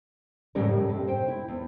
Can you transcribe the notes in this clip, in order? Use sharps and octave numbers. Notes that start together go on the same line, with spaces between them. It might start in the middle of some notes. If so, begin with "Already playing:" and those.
F2 A2 C#3 G3 C#4 A#4
F#2
C3
C5 G5
E4
E2